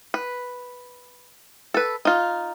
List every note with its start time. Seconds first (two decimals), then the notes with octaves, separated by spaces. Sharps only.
0.14 B4
1.74 A4 B4
2.05 D#4 F4